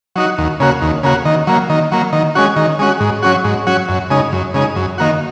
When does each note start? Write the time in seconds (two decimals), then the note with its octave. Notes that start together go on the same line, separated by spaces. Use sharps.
0.16 F#3 D#4 F#4
0.38 D#2
0.60 C#3 A#3 F#4
0.82 D#2
1.03 C#3 A#3 F#4
1.25 D#3
1.47 F#3 A#3
1.70 D#3
1.92 F#3 A#3
2.13 D#3
2.35 G#3 C#4 F#4
2.56 D#3
2.79 G#3 C#4 F#4
3.00 G#2
3.22 F#3 C#4 F#4
3.44 G#2
3.67 F#3 C#4 F#4
3.89 F#2
4.10 C#3 G#3 D#4
4.33 F#2
4.54 C#3 G#3 D#4
4.76 F#2
4.98 D#3 A#3 F#4